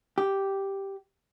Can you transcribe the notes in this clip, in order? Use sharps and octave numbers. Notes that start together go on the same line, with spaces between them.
G4